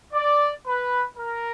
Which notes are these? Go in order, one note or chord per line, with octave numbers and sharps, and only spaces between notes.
D5
B4
A#4